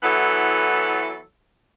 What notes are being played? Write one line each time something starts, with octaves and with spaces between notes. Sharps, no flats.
E3 F#3 B3 E4 A4